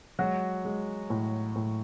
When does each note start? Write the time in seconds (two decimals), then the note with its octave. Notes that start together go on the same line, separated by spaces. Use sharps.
0.19 F#3 G#3 F#4
0.65 G#3
1.10 A2
1.56 A2